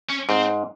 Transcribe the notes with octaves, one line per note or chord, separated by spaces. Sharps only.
C#4
G#2 C4